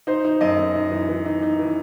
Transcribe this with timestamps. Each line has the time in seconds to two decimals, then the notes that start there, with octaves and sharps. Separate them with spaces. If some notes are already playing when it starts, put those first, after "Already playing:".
0.07 D#4 C5
0.24 D#4
0.41 F#2 D#5
0.58 F#2
0.75 D#4
0.92 E3
1.09 E3
1.26 D#4
1.43 D#4
1.59 E3